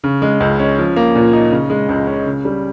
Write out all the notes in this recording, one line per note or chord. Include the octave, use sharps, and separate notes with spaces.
C#3
G#3
C#2
C#4
F3
A#3
A#2
D#4
C#3
G#3
C#2
C#4
C#3
G3